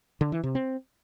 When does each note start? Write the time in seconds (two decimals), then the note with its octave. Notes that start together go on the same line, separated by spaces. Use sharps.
0.21 D3
0.32 E3
0.44 C3
0.55 C4